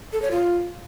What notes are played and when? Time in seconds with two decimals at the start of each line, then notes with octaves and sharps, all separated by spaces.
0.13 A4
0.22 C#5
0.31 F4